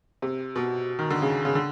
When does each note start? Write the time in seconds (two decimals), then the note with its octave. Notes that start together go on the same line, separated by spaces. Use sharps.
0.22 C3
0.56 B2
0.99 D#3
1.10 D3
1.22 C#3
1.45 C#3
1.55 D3